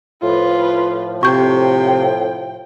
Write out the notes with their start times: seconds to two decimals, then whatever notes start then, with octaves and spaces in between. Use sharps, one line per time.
0.22 A2 F3 F4 B4
1.23 C3 G5 C#6 G6